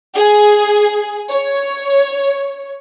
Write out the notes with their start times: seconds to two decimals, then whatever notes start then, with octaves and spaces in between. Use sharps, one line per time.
0.15 G#4
1.30 C#5